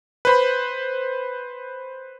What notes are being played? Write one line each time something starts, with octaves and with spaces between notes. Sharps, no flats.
B4 C5 B5